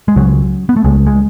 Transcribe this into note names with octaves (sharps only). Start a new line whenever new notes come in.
G#3
C#2 C#3 F#3
B3
A3
C#2 C#3 G#3
G#3